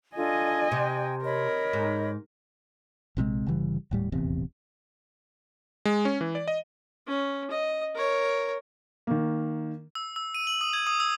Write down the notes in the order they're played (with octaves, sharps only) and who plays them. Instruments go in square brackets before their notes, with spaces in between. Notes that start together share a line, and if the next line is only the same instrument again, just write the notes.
[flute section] D4 F4 A4 [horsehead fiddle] D#5 G#5
[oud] C3 [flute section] G5
[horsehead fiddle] A#4 [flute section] C#5 D#5 B5
[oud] G#2
[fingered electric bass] A#1 C3 D#3 G#3
G1 C#3 E3 G3
D#1 A2 G3
D#1 A1 E2 C3
[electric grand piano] G#3
C#4
E3
D5
D#5
[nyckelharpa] C#4
D#5
A#4 C#5
[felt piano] D#3 A#3
[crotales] E6
E6
D#7
F#7
D#6
G#6
D#6
E6